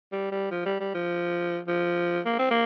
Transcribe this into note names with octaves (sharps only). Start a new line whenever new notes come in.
G3
G3
F3
G3
G3
F3
F3
A#3
C4
A#3